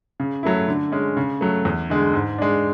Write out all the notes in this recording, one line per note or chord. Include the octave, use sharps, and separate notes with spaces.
C#3
F#3 A3 E4
D3
G#3 C#4
C#3
F#3 A3
E2
D3 G#3
G#2
G#3 D4